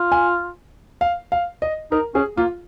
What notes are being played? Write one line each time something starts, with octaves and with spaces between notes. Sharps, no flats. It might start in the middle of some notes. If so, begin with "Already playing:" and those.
Already playing: F4
G#5
F5
F5
D#5
D#4 A#4
C#4 G#4
A#3 F4